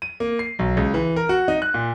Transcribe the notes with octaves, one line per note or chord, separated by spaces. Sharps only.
D#7
A#3
C7
B1
C#2
E3
A#4
F#4
D#4
F#6
A#2